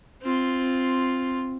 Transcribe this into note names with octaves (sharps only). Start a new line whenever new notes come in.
C4 F4